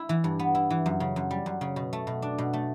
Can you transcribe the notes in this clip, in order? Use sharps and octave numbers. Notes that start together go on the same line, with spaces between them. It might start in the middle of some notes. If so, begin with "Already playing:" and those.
Already playing: E4
E3
G2
B3
E4
E3
F#2
C#3
F#2
G3
F#2
C#3
B2
A3
B2
D4
B2
A3